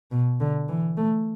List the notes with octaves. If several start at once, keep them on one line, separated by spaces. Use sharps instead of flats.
B2
D3
E3
A3